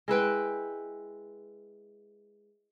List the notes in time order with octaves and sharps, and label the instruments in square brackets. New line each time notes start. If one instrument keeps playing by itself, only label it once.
[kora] G#3 E4 B4 G5